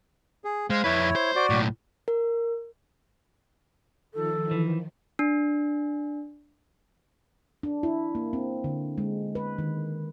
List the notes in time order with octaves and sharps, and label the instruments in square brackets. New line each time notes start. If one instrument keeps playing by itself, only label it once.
[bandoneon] G#4
[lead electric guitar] G#3 [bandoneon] C5 F5
[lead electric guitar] F2 B4 [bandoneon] E4 C#5
[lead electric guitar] C5
[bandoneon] F#4 D5
[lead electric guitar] B1 A2
[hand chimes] A#4
[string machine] D#3 F3 [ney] A4
[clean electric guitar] E3
[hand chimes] D4
[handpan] D4
E4
A#3
C4
D3
G#3
B4
D#3